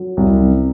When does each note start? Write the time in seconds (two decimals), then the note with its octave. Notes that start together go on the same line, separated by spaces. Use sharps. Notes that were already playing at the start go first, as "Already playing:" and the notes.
Already playing: F#3
0.17 C2
0.41 C3